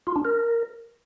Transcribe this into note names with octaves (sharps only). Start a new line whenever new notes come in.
F4
D4
A#4